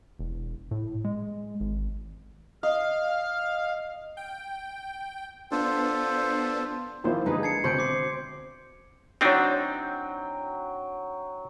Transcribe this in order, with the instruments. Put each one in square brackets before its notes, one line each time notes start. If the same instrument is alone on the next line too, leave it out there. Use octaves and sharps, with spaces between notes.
[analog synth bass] E1
A2
G#3
G#1
[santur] D#5 [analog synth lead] F5 [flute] F6
[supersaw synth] G5
[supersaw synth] B3 D4 [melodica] F4 A4 C5
[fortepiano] G#1 F3 C5 [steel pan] A#3 E4 [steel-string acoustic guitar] F5
[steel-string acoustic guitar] D3 G3 A#4 [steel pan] G#3 D4 G#4 [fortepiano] D#4 B4
[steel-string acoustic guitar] A5 [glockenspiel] G#6 C7 C#7
[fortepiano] D2 B2 C#6 [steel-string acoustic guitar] C4 C5 [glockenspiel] C6 G6 D7
[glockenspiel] D6 C7
[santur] F#3 G5 [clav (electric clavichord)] C4 D4 D#4